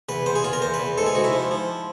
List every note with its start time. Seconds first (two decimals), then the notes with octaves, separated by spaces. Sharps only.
0.09 E2 B4
0.26 E2 C5
0.35 G#4
0.44 E2 F4
0.53 A#4
0.62 E2 C5
0.74 B4
0.80 E2
0.98 G#2 A4
1.06 G#4
1.15 G#2 F#4
1.24 E4
1.33 F3
1.51 F3